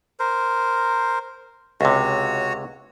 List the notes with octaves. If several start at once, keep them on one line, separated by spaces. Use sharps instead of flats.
A#4 C5
C#2 C3 F#4 C#5